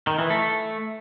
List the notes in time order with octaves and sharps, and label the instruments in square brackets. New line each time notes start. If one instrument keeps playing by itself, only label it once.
[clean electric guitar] D#3
E3
A3